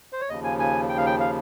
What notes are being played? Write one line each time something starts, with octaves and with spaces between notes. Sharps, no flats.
C5
C#5
D#2 C#3 F3 D#5
G#5
G#5
G5
F5
G5
F5